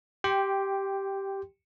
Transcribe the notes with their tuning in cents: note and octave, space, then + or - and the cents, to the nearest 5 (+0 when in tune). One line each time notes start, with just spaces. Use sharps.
G4 -5 G5 +5 C6 +0